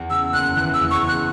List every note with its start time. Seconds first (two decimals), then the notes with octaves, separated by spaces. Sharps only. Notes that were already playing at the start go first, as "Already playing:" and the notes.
Already playing: E2
0.10 C#3 E6
0.33 F#1 F#6
0.56 E3 F#6
0.74 E6
0.80 E2
0.91 C#6
1.03 C#3
1.08 F#6